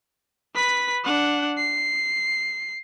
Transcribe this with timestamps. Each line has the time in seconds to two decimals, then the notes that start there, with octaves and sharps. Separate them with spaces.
0.54 B4 B6
1.04 D4 F#5
1.57 C7